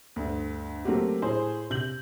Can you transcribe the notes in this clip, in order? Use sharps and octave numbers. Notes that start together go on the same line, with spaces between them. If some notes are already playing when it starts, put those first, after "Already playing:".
D2 G2
F#3 A3 A#3 C4 F#4 G4
A2 G#4 C5
C3 G6 F#7